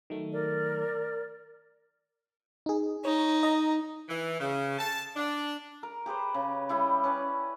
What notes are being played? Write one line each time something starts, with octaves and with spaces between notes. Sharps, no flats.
D#3 F#3 A3
A#4 D5
D#4 G#4
D#4 C#5
D#5 A#5
E3
C#3
A5
D4
A#4
G4 G#4 B4 C5
C#3
G3 E4 D#5 B5
C#4 B4 D5